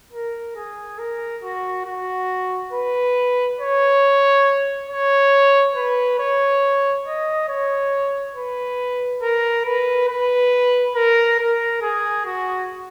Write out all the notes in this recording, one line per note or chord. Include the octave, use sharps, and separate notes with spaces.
A#4
G#4
A#4
F#4
F#4
B4
C#5
C#5
B4
C#5
D#5
C#5
B4
A#4
B4
B4
A#4
A#4
G#4
F#4